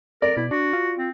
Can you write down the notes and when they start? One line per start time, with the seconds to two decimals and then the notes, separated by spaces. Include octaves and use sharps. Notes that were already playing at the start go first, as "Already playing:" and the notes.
0.22 A#4 D5
0.37 B2 E4
0.51 D4 F#4
0.73 F4
0.99 C4